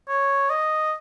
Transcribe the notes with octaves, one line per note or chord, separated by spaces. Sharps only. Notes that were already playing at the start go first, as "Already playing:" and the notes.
C#5
D#5